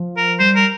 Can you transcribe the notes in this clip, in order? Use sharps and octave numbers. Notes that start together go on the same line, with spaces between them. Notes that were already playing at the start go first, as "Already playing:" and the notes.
Already playing: F3
A#4
G3 C5
A#4